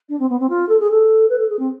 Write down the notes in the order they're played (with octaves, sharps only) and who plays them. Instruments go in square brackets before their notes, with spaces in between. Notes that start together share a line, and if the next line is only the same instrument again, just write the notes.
[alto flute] D4
C4
B3
C4
F4
A4
G#4
A4
B4
A4
G#4
C4